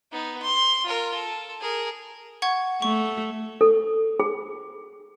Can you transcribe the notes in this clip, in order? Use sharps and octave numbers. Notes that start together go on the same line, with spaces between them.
B3 D#4
C6
F4 A#4
A4
G#4 A#4
F#5 C#6 G#6
A3 C#6
A4
G#4